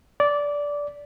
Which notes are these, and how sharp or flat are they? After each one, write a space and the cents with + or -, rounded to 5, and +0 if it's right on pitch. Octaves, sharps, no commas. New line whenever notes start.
D5 -15